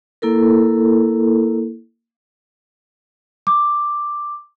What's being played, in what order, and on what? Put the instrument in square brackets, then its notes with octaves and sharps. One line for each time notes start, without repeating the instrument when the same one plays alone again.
[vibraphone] A#3 E4 A4 A#4
[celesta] D6